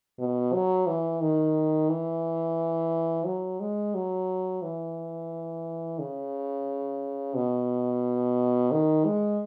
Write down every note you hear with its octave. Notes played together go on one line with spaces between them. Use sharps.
B2
F#3
E3
D#3
E3
F#3
G#3
F#3
E3
C#3
B2
D#3
G#3